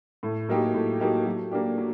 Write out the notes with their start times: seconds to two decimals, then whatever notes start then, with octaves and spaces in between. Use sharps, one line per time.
0.23 A2
0.49 F#3 A#3 D#4 G4
0.74 A2
1.00 F#3 A#3 D#4 G4
1.26 F#3
1.51 A#3 D4 G4
1.78 F#3